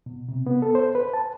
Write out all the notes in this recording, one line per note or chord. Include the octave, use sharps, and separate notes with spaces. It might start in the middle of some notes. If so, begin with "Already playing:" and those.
B2
C3
B3
A4
C5
B4
A5